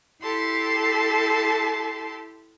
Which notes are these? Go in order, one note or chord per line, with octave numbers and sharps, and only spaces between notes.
E4 G4 A4 A5 C6